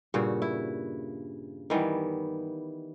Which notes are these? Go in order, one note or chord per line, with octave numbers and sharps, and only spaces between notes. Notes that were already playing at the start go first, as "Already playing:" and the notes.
G2 A#2 C#3 F#4
E4
D#3 E3 G3 B3